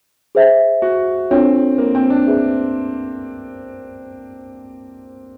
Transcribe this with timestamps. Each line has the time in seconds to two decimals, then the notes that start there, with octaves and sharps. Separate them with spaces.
0.35 G#4 C5 E5
0.82 F#4
1.30 C4 D4 F4 A4 C#5
1.78 A#3
1.95 C4
2.10 D4
2.27 G#4 B4 E5